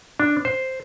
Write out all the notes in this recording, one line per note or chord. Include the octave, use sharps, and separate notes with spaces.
D4
C5